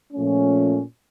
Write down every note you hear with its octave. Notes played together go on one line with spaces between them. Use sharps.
A#2 F3 A3 C#4